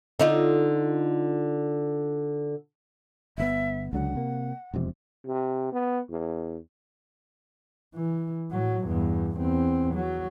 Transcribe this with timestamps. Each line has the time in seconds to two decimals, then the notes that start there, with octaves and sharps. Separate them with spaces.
0.19 D3 D#4 F4
3.38 G1 D3 B3 E5
3.93 C#2 D3 F#3 F#5
4.15 C3 A#3
4.74 E1 F2 C3
5.26 C3
5.72 B3
6.10 E2
7.94 E3
8.51 A2 F#3
8.84 E2 G2
9.38 E2 C4
9.95 F#3